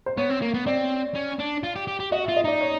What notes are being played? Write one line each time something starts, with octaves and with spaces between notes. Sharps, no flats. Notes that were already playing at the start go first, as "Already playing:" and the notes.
C5
B3 C#5
C4
A#3
B3
C4 D5
C#4
D4
F4
G4
G4
G4
F#4 D#5
F4 E5
D#5
D#4 D5
C#5